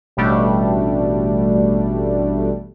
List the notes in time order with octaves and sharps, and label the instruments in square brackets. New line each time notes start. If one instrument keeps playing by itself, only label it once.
[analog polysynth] A1 B2 G3 A3 D4